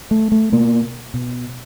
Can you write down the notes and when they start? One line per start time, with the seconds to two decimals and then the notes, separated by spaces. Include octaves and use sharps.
0.11 A3
0.32 A3
0.52 B2 A#3
1.14 B2